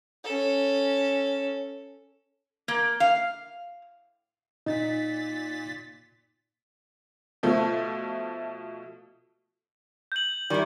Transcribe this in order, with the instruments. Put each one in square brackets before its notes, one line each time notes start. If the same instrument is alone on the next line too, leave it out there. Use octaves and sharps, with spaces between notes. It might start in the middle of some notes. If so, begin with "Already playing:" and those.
[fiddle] C#4 A4
[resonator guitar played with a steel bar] A#3
F5
[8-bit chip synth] A#2 A6 B6 [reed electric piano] D#4
[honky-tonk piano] B2 F3 A3
[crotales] G6 F#7
[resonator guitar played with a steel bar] D#3 E4 [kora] G3